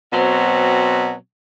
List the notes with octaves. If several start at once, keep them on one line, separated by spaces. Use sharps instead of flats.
B2 F#3 C4